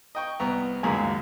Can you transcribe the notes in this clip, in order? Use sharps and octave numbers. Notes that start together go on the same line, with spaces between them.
D#5 G5 C#6
C2 B3 A#5
G#1 C#2 F#2 G#3 A#3 G#5